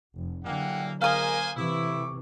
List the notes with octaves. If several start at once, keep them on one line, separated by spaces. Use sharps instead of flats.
F1
D3 E3 F#3 G3 A#3 F#5 G5
G#3 A#3 A#4 C5 F5 G#5 D#6
C3 E3 A3 E4 C#6 D6